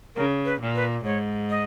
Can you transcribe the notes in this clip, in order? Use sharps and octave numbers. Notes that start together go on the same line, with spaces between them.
C#3 A#4
B4
A#2
B4
G#2 C#5
D#5